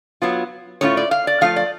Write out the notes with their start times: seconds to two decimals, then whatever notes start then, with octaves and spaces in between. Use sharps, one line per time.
0.22 F#3 B3 F4
0.81 A2 F#3 A3 C#4 F4 C#5
0.97 D5
1.11 F5
1.27 D5
1.41 F3 A3 F4 F5
1.56 D5